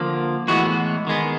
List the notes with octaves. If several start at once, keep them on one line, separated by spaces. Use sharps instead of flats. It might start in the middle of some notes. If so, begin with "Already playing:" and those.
Already playing: D3 F3 A#3
A2 E3 G#3 B3 F#4
D#3 G#3 B3